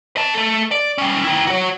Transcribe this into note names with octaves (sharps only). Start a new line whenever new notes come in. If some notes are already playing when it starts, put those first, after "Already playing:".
D#5 A5
A3 A4
D5
G3 C#4
D#3 E4
F#4 C#5